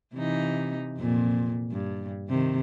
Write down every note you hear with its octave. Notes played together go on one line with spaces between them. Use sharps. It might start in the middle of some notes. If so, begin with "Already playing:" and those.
C3 E3 D#4
F2 A#2
G2
C3 D#3